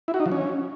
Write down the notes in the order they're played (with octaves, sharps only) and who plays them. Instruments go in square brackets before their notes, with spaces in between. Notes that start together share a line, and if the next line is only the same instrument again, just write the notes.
[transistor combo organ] E4
F#4
D#4
F3
C#4